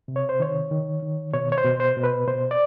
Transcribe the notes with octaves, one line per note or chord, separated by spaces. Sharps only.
C3
C#5
C5
D#3 C#5
D#3
D#3
B2 C#5
C#5
C5
B2
C5
B2
B4
B2 C5
D5